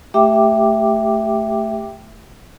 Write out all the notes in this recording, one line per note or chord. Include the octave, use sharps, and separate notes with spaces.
A3 G4 E5 G5 D6